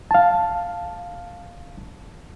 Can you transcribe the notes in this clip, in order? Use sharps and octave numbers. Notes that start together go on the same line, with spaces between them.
F5 A5